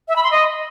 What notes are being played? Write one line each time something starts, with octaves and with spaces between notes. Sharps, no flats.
E5
B5
C6
D#5